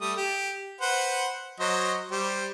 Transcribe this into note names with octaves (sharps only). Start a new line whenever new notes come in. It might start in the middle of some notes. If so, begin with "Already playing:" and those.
G3 A3 D#6
G4
B4 C5 F#5
F#3 C5 D#5
G3 C5